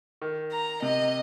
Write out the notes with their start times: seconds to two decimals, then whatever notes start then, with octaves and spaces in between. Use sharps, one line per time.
0.22 D#3
0.52 A#5
0.82 C3 D#5